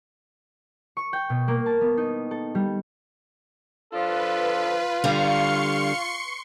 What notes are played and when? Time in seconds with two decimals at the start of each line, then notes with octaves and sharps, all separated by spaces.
0.97 C#6
1.13 G5
1.30 B2
1.48 A#3
1.66 A5
1.81 B3
1.97 D#4
2.31 A4
2.55 G3
3.93 F3 D4 F4 A4 B4
5.04 D3 G3 F5 A#5 C6 C#6 C#7